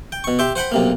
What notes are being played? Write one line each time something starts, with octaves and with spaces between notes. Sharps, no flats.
G5
B2 C#6
G4 E5 G5 C6
C5 F#5 G5 B5
B1 C3 A#3